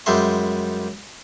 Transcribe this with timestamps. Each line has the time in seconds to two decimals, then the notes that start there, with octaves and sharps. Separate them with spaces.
0.06 F#2 G3 G#3 E5 C6